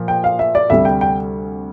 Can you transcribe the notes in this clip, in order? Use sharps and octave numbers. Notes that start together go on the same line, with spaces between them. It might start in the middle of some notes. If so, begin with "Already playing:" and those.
Already playing: A#2 F3 A#3
G5
F5
E5
D5
D2 C3 G3 E5
G5
G5